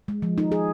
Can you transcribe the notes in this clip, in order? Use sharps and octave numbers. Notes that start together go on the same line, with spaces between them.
G#3
F3
D#4
G#4